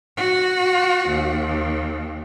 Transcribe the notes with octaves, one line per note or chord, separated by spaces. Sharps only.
F#4
D#2